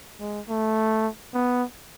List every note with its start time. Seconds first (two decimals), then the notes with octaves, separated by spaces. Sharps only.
0.21 G#3
0.49 A3
1.34 B3